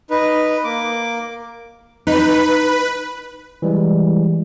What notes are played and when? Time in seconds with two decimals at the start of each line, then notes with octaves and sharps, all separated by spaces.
0.10 D#4 B4
0.64 A#3 D6
2.07 D#4 B4
3.62 E3 G3 G#3